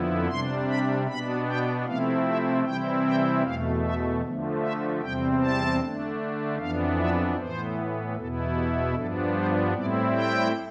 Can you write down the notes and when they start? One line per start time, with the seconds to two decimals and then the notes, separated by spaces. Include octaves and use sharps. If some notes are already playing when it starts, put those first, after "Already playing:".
Already playing: F2 D3 F3 B3 E4
0.28 C3 G3 D4 C6
0.67 B5
1.07 B2 B3 D4 B5
1.47 G5
1.86 C3 F3 A3 C4 E4 F5
2.26 E5
2.64 C3 E3 G3 C4 E4 G5
3.04 G5
3.43 E2 B2 A3 F5
3.83 E5
4.22 D3 F3 A3
4.61 E5
5.01 E2 C3 G3 C4 G5
5.40 A5
5.79 D3 A3 D4
6.58 F2 E3 B3 D4 F5
6.98 E5
7.37 A2 E3 B3 C5
8.16 E2 B2 B3 E4 A4
8.55 G4
8.95 G2 F3 B3 D4 A4
9.35 C5
9.74 A2 G3 C4 E4 D5
10.13 G5